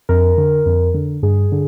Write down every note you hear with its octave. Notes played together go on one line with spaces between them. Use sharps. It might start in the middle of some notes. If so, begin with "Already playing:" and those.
F2 A#4
D3
F2
D3
G2 G#4
D3